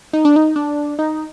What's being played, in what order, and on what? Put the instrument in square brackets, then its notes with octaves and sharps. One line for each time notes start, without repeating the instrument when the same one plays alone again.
[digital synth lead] D#4
D4
D#4
D4
D#4